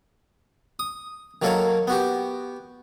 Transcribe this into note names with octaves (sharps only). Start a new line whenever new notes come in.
D#6
D#3 F#3 A#3 A4 A#4 C#5
B3 F#4 G4